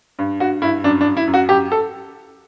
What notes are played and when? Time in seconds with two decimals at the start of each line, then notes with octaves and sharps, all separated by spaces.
0.19 G2
0.40 G2 F#4
0.62 G2 E4
0.84 F#2 D4
1.01 D4
1.06 F#2
1.17 E4
1.27 F#2
1.34 F#4
1.49 F#2 G4
1.72 A4